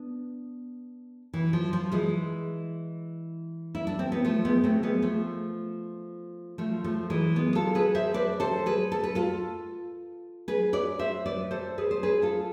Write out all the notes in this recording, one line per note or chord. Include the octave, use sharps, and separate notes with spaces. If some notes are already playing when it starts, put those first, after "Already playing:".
Already playing: B3 D4
E3
F3
F3
E3 G#3
E4
D4
C4
B3
F3 A3
G#3 B3
A3 C4
G#3 B3
F3 A3
F3 A3
F3 A3
E3 G#3
G#3 B3
F4 A4
G#4 B4
C5 E5
B4 D5
A4 C5
G#4 B4
A4
B4
F4 A4
G#4 B4
B4 D5
C5 E5
B4 D5
A4 C5
G#4 B4
C5
G#4 B4
F4 A4